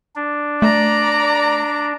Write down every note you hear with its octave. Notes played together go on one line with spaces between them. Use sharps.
D4
A3 D5 A#5